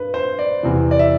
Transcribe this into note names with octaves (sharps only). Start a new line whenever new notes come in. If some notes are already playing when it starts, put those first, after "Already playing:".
Already playing: G2 B4
C5
D5
E2 C3 E3
D5
E5